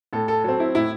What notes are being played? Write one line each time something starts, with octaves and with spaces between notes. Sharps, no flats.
A2 A4
A4
F#3 C4 A4
E4
A2 E4